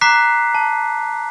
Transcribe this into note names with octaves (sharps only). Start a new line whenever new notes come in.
A#5 D6 F#6 B6 C7
A5